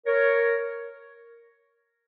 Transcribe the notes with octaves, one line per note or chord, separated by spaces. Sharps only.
A#4 C#5